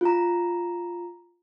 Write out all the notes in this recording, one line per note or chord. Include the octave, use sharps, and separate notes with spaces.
F4 A#5